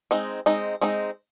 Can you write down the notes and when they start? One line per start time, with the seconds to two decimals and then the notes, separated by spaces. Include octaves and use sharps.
0.11 G#3 C4 D#4
0.46 G#3 C4 D#4
0.81 G#3 C4 D#4